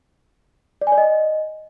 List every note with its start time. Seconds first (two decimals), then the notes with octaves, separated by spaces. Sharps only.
0.81 D5
0.87 G#5
0.92 D5
0.98 D#5